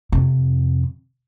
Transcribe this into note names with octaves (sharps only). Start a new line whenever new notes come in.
F2 C3